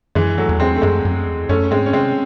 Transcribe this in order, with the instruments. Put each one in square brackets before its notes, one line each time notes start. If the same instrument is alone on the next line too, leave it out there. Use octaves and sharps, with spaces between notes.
[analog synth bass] F#2 [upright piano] E3 G#3
[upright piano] F#3 A3
[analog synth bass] E2
[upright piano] G#3 C4
A3
[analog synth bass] F#2 [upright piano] G#3 C4
[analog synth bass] F#2
E2
[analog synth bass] F#2 [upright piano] A3 C#4
[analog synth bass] G#2 [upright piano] G#3 C4
[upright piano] C#4
[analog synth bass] C3 [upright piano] G#3 C4